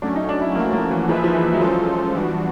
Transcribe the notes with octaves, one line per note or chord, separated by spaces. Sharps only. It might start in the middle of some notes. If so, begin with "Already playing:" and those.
F#3 A3 C#4 D4
D#4
D4
E4
F3 A3 A#3 C#4 F#4
A#3
E3
F3 A#3 D#4 G#4 B4 E5
F3
E3
F#3
F3 G#3 C#4 F4 A4 C5
E3 G3 B3 D4 F#4